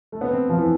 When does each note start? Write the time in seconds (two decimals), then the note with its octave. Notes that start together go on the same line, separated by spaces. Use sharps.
0.12 A3
0.21 B3
0.31 C4
0.49 F3
0.58 E3